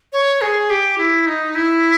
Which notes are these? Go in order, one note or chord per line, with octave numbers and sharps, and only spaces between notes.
C#5
G#4
G4
E4
D#4
E4